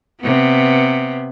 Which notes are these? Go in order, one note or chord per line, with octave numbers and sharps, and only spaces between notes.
C3 B3